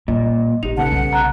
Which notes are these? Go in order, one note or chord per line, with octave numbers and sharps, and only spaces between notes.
A#2 G3 D#5
A1 D#4 G4 F7
C#3 B3 A4 F#5 A5
B1 G3
A#5 F#6